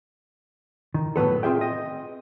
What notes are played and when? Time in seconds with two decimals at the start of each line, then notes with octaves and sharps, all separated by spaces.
0.94 D#3
1.16 A2 F#3 B3 A4
1.43 C4 F4 G#4 E5 G5
1.61 D#5